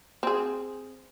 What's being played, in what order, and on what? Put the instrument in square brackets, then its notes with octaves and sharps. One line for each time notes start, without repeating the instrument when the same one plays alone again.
[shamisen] C4 G#4